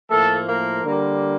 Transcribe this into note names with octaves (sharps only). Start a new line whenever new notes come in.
A2 F3 A3 A#3 A4
A#3 A#4
D3 G3 A#3